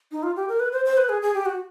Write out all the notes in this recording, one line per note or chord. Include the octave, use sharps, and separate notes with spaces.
D#4
F4
G4
A#4
B4
C5
C5
B4
G#4
G#4
G4
F#4